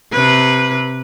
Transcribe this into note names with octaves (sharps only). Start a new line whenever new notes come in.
C3 B4